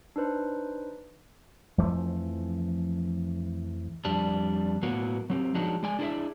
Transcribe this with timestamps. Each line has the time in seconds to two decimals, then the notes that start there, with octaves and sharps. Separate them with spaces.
0.16 D4 D#4 B4 C5
1.78 F2 E3 F3 A3
4.05 F2 G3 D4
4.83 A2 F#3 A#3 B3 F#4
5.30 F#3 C4 G4
5.54 F3 F#3 G#3 D4 D#4 F#4
5.83 G#3 D5 G#5
5.99 D4 E4 G#4 B4 D5 E5